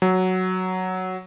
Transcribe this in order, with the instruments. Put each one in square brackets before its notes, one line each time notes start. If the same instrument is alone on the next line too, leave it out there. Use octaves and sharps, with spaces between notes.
[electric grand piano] F#3